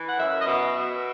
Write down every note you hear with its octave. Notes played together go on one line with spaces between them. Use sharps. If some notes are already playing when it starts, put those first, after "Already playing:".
Already playing: E3
F#5
F#2 E5
D#5
B2 E5
B2